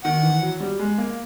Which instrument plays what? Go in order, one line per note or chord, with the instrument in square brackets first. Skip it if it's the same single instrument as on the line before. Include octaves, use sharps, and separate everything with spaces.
[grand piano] D#3 [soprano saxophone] F#5
[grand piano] E3
F#3
G3
G#3
A#3